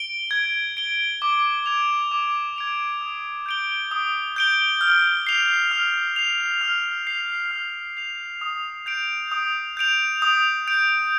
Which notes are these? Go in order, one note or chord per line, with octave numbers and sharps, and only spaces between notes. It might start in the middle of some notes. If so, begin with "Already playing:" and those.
Already playing: D7 G7
G#6
D7 G7
D6
G#6 D7 F7
D6
G#6 D7 F7
D#6
G6 D7 G7
D#6
G6 D7 G7
F6
C7 F7
F6
C7 F7
F6
C7 F7
F6
C7 F7
D#6
G6 D7 F7
D#6
G6 D7 F7
D#6
G6 D7